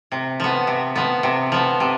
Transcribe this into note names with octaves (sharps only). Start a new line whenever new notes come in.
C3
F3 B3
C3
F3 B3
C3
F3 B3
C3